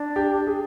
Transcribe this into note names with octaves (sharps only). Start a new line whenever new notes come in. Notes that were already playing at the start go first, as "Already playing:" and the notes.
Already playing: D4
G4
G#4